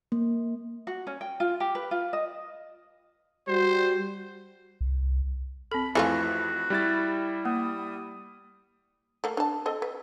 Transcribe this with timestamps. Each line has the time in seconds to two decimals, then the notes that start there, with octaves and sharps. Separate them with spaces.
0.12 A#3
0.87 F#4
1.07 C#4
1.21 G5
1.40 F4
1.60 G4
1.75 B4
1.91 F4
2.13 D#5
3.48 G3 F#4 C5
4.81 C2
5.72 C4 A4 B5
5.95 F2 E3 A3 F4 F#4
6.70 G3 E4 A6
7.45 A#3 D#6
9.24 A3 A#3
9.37 D4 A5
9.66 C4 A4 D#5
9.82 B4